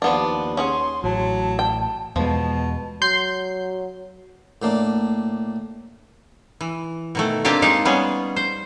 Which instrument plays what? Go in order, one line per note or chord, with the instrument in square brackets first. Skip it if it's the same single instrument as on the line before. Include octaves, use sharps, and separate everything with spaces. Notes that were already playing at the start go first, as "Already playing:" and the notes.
[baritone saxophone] D#2 [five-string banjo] F3 B3 D4 [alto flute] A5
[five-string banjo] C#4 G#4 F#5 [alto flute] C6
[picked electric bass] A1 [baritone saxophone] F#3 [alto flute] A5
[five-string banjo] G5
[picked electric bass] E2 G#3 [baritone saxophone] B2 [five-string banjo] F3 [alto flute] A5
[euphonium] F#3 [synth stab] C6 G6 C7
[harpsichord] A2 A#3 D4
[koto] E3
B2 D#3 A3
A#3 C4 D4 F4 G4 F5
G#3 D#4 F5
G3 B3 C#4 G#4
C5